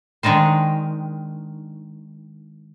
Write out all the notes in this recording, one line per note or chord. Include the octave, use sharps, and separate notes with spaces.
D#3 G#3 D4 D#4 C5